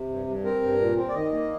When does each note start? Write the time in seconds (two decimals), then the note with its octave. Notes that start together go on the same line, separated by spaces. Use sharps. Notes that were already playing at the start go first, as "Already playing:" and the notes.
Already playing: C3
0.10 G2
0.27 G2
0.44 C4 A#4
0.62 G2
0.80 A#2
0.97 C4
1.09 D5
1.14 D#3 D#5
1.32 A#3